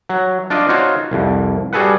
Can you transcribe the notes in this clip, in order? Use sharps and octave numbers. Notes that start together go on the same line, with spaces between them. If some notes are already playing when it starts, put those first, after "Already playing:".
F#3
D4 F4 D5 D#5
D#4 F4 F#4 C5 C#5
C2 F2
G3 F#4 G#4 A4 B4 F#5